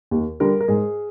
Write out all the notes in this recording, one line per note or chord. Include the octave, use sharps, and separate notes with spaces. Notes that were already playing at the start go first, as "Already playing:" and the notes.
D#2
D3 G3 A#4
A#4
G#2 G#4